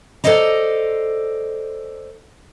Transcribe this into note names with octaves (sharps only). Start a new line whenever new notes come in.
A4 C5 D5 D#5 A#5